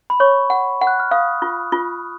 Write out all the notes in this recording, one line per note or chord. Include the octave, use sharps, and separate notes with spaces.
B5
C#5 C#6
F#5
F#5
F#6
F6
F5 D#6
F4
F4